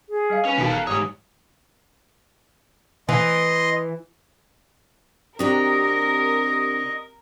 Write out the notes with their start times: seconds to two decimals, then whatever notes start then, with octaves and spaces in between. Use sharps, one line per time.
0.09 G#4
0.30 G3 D#5 F5
0.45 C#4 B4
0.58 E1 D#4 F#4 A4 A#4 F5 A5
0.71 A#5 F6 F#6 C#7
0.87 E2 G#2 G3 C#5 D#6
3.09 E3 D#5 C6
5.39 C3 C4 D4 F#4 G4 A#4 D#5 A#5